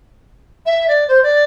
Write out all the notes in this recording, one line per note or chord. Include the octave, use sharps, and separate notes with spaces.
E5
D5
C5
D5